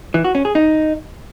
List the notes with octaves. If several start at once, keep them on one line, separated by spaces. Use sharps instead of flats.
E3
F#4
C#4
G#4
D#4